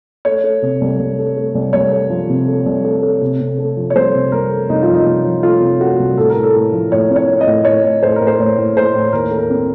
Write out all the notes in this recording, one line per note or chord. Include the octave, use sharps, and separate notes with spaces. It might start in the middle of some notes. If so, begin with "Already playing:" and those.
A3 C#5
A3
C3
C2
C2
A3
A3
C2
C2 C#5
A3
F3
C3
A3
C2
A3
A3
C3
C3
A3
F3
C#5
C2 C5
C3
C2 A#4
A3
C2 D#4
F4
F3
D#4
C2
F3
A3 F4
C3
A3 F#4
C2
A2 A4
A#4
A2
A4
A2
F3
A2 C#5
C4
C#5
C4
D#5
A2
A2 C#5
A2
A2 C5
A2 A#4
C5
A2 C#5
A2
A2 C5
A2
D#2 A#4
A3
A#4
C4